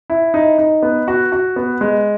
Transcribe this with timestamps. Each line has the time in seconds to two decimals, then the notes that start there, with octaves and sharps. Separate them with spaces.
0.10 E4
0.34 D#4
0.59 D#4
0.83 B3
1.08 F#4
1.32 F#4
1.56 B3
1.81 G#3